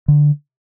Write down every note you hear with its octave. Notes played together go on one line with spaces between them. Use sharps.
D3